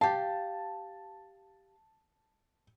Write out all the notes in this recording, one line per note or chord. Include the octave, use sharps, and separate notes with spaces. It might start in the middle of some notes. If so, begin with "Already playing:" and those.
G4 F5 A5